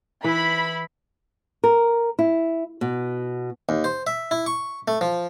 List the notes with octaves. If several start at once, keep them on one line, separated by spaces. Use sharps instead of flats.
E3 E4 B5
A#4
E4
B2
D#2
C5
E5
E4
C#6
A3
F3